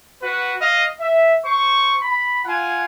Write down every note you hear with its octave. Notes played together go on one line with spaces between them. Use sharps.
F#4 B4 F#5
D#5 F5 D#6
E5
C5 C#6
B5
F4 F#5 G#5